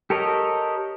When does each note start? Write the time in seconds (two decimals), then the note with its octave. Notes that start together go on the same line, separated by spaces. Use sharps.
0.10 G4 A4 A#4 C#5 D#5